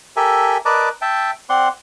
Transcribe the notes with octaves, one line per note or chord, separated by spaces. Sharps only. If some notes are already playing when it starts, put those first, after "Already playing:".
G4 A4 A#4 E5 G#5
A#4 B4 D5 D#5 A5 D6
E5 G5 A5
C4 D5 F#5 C6